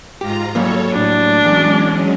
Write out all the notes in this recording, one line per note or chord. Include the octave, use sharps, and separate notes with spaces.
G#2 F4 G4 A#5
F#3 G3 A#3 A4 C#5
A2 D4
E2 F#3 G#3 C#4